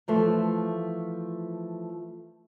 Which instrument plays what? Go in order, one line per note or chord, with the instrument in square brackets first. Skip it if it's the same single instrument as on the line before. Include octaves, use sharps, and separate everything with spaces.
[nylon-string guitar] E3 F3 A3